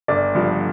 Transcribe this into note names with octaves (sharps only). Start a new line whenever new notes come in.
G1 D5
G2 D3 F3